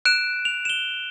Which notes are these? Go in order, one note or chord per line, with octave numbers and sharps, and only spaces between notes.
F#6 D7 E7
F7
E7 G7